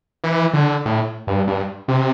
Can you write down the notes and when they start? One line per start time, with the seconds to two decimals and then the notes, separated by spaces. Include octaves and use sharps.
0.24 E3
0.54 D3
0.85 A2
1.27 G2
1.47 G2
1.88 C3